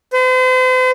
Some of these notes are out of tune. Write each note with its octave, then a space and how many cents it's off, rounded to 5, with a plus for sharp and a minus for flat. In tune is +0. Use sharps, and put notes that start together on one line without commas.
C5 -40